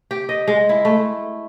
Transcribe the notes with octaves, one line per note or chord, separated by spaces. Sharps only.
G4
D#5
G#3
E4
A3